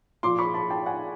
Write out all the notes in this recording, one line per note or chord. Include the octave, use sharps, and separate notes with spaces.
A#2 F3 C6 D6
B5 C#6
A5 B5
G5 A5
F#5 G#5